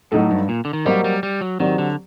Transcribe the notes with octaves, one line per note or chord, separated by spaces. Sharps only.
A2 F#3 A3 D#4 A4
G2
A#2
D3
D#3
F#3 G3 A#3 F#4 C5 D#5
G3
G3
F#3
D#3 F#3 C4 G4 D5
D3